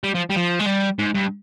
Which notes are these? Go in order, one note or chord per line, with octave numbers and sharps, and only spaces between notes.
G3
F3
G3
F3
G#3
G3
G#2
G2